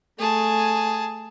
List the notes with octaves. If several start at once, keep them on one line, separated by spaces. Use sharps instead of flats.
A3 G#4 G#5 A5